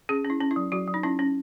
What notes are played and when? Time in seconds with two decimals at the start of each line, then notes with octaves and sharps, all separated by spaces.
0.09 C#4 G#4
0.25 C#4
0.30 E4
0.41 C#4
0.51 E4
0.56 F#3
0.72 F#3 F#4
0.87 F#3
0.94 D#4
1.03 C#4 E4
1.19 C#4